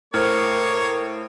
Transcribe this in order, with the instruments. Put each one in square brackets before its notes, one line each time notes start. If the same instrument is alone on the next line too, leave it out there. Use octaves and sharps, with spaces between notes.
[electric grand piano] A2 [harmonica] A#3 C#5 [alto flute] A#4 [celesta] C5 F6